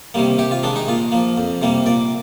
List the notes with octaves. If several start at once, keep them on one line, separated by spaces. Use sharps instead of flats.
C3 D#3 G3 A#3
C3 G4
F4
D#3 G#3 D4
D#4
A#2 F4
F3 A#3
F2
C3 G3 A#3
A#2 D5